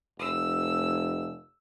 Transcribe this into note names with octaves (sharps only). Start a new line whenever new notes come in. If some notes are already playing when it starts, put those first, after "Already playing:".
F1 E6